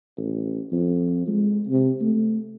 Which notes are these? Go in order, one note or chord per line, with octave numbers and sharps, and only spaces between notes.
A1
F2
G#3
C3
A3